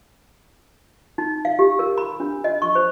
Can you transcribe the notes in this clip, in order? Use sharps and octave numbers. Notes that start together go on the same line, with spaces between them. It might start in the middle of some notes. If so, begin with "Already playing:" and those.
D#4
F5
G4
A#4
B5
D4
D#5
C#6
C5